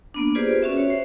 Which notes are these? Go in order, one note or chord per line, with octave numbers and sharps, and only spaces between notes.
A#3 B3 D4
F4 G4 G#4 B4 C5 D5
C#4 F#4 E5
C#5
C5